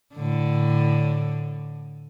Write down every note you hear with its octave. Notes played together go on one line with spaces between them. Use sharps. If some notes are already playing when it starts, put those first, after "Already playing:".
A2 D3